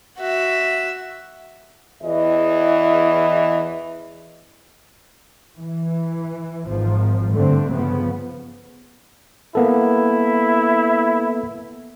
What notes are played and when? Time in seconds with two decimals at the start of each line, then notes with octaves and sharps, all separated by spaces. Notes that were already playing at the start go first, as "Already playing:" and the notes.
0.19 F#4 E5
2.03 E2 E3 E4 D#5
5.59 E3
6.66 G#1 F3
7.32 G2 D3 A3 C4
7.70 C#3 F3 B3
9.55 A#3 B3 E4 A4